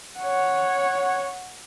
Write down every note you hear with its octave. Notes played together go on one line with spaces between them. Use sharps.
C#5 F#5